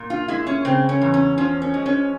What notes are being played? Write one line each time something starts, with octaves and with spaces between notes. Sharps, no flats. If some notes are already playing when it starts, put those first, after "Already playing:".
Already playing: A#2
F4
G#3 E4
C#4
C#3 C4
C#4
E2
C#4
F3 C#4
C#4
G#3
C#4